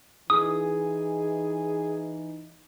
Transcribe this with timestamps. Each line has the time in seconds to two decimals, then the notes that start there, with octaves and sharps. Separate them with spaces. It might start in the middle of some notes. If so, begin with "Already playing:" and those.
0.30 E3 D#4 G#4 D#6